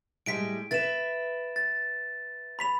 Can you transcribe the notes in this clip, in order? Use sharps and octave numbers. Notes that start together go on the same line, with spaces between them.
A2 G3 G#3 B6 D7
B4 E5 A6 E7
A6
B5 B6 F7